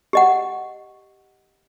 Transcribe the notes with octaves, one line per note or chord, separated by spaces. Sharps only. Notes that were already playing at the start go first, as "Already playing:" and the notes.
G4 D#5 F#5